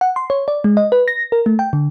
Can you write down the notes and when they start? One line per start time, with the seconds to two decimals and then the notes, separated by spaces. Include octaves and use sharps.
0.01 F#5
0.16 C6
0.30 C#5
0.48 D5
0.64 G#3
0.77 D#5
0.92 B4
1.08 A#6
1.32 A#4
1.46 A3
1.59 G5
1.73 D3